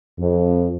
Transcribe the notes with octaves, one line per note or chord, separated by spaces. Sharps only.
F2